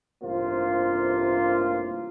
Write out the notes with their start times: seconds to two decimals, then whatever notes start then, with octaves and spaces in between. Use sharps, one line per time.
0.22 A1 G2 C3 A#3 F4 C5